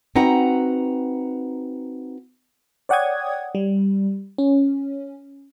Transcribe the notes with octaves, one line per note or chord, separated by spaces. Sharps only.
C4 D#4 F#4 B4 F#5 A#5
C#5 D5 F#5 G5 D#6 G#6
G3
C#4